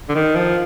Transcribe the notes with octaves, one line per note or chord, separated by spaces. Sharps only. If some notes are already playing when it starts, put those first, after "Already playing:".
D3
D#3
F3